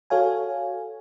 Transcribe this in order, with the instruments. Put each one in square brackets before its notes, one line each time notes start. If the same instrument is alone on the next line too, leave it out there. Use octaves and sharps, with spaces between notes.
[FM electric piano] F#4 A4 C#5 F5 G#5